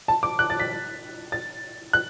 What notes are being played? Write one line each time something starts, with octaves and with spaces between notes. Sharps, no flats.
A5
D6
F#6
A6
B6
A6
F#6